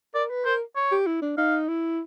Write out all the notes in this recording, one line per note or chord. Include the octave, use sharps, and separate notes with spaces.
A#4 D5
B4
A#4 C5
C#5
G4
E4
D4
D#4 F5
E4